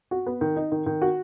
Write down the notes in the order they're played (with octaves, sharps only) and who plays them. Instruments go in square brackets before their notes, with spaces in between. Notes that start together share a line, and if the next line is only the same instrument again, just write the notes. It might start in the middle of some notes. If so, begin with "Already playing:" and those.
[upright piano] F#4
B3
D#3
D#4
D#3
D#3
F#4